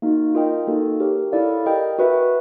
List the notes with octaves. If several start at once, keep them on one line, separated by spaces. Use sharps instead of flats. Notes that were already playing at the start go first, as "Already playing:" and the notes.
A#3 D#4 F#4
F4 A#4 D#5 G5
A#3 D#4 F#4 A4
G4 A#4 C#5
E4 A4 D5 F5
G4 A#4 D#5 G5
F#4 B4 E5